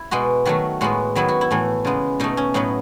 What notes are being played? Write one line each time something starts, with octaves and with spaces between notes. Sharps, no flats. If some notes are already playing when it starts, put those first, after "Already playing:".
Already playing: E4
B2 G#3 B3 F#4
D#3 F#3 A3 F#4
A2 G#3 B3 F#4
D#3 F#3 B3 E4
F#4
E4
A2 E3 A3
C#3 G#3 B3
B2 A3 D#4
C#4
A2 F#3 B3 D#4